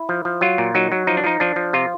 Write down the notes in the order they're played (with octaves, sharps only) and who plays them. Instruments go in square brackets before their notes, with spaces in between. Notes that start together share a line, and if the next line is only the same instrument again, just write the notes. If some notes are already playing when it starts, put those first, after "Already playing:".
Already playing: [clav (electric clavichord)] E4
F3
F3
F#3 F4
A#2
F#3 D#4
F#3
F3 D#4
D4
F3 D#4
F3 D4
F3
C3 F4